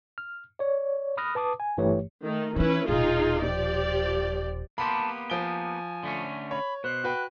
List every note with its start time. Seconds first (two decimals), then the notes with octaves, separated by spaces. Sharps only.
0.18 F6
0.59 C#5 D5
1.17 B5 D#6 F6 F#6 A#6
1.35 B4 A5 D6 D#6
1.60 G#5
1.77 G1 G2 E3 A3 G4 C#5
2.24 D#3 A3 D#4
2.56 E3 C#4 D#4 E4 B4
2.88 D#1 B2 D#4 F4 G#4
3.41 F3 G4 D5
4.78 A#3 B3 G4 A5 B5 C6
5.30 F3 G#5 D7 G7
6.03 D3 A3 C#4
6.51 C#5 B5
6.84 B2 C5 F#6
7.04 F#4 B4 G5